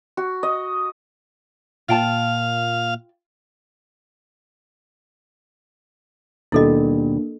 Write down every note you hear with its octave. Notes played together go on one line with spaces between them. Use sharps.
F#4
D#5
A#2 F4 F5 G5 A5
D#2 B2 G3 A#3 D4 E4 A4 D#5